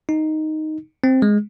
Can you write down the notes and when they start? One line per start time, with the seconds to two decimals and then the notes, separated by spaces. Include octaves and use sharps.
0.09 D#4
1.04 C4
1.22 G#3